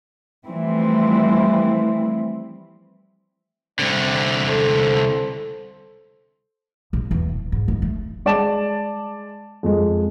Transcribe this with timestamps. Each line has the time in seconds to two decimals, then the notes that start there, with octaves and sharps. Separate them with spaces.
0.46 E3 F3 G3 A3 C4 E4
3.79 C2 D3 C4 C5 D5
4.46 A4 C5
6.93 A#1
7.11 E2
7.32 D#1
7.52 G#2
7.68 D#2
7.82 A3
8.25 G#3 D5 A5 E7
9.63 F2 G#3